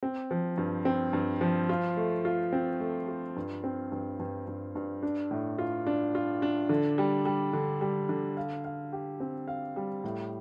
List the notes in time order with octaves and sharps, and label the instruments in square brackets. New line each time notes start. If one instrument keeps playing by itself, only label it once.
[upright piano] C4
F3
G2
C4
G2
F3
F4
A3
F4
C4
A3
F4
G2
C4
G2
G2
G2
G2
D4
A2
F4
D4
F4
D4
D3
G3
G3
D3
G3
D3
F5
F5
G4
C4
F5
G3
A2